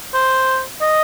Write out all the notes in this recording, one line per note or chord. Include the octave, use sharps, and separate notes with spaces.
C5
D#5